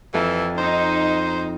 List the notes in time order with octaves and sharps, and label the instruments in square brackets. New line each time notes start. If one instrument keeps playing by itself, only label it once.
[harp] F2 A4 [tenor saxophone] E3
[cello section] D#4 [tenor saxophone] C5